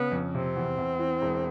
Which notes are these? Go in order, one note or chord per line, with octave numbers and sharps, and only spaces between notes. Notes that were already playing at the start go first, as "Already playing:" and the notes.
Already playing: C#3 B3
F2
C3 C4
E2
E2
E3
E1